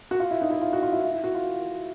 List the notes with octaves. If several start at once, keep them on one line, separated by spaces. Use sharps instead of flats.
F#4
F4
E4
D#4
E4
F4
F#4
F4
E4
E4
E4
F#4
F4